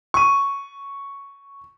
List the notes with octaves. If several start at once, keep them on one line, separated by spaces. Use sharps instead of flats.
C#6 D#7